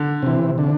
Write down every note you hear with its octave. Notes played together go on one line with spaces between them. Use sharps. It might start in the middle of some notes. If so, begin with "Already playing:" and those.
Already playing: D3
C3 E3
D3